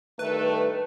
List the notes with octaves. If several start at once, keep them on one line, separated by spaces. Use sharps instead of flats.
G2 D#3 A3 B4